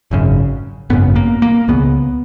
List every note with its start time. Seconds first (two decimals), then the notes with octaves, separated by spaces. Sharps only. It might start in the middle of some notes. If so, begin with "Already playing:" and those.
0.11 G#1 F#2 C#3
0.90 G#1 F#2 C#3 B3
1.16 A#3
1.42 A#3
1.68 C#2 C#3 B3